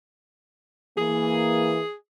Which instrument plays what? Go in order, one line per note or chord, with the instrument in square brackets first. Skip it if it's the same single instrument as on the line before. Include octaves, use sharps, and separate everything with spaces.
[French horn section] E3 A#3 [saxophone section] G#4